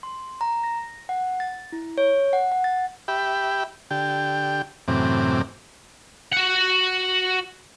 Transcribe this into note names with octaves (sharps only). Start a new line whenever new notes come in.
C6
A#5
A#6
F#5
A6
E4
C#5
F#5
F#5
A6
G4 E5 G5 B5
D3 G4 G5
F#2 A2 C3 E3 C4 D6
F#4 F#5